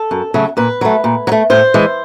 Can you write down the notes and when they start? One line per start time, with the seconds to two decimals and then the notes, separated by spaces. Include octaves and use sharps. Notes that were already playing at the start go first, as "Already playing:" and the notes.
Already playing: A4
0.11 F#2
0.34 C#3 F#3 A3
0.57 A#2 B4
0.81 F#3 A3
1.04 A#2
1.27 F#3
1.32 A3
1.50 A2 C5
1.74 E3 G#3